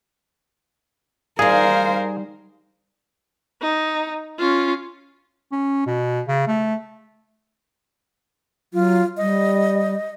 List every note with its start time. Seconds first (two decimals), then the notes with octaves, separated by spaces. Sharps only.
1.39 G3 D#4 G#4 A#4 C5 F5
3.62 D#4
4.39 C#4 F4
5.52 C#4
5.86 B2
6.28 C#3
6.48 A3
8.73 F#3 F4
9.17 G3 D#5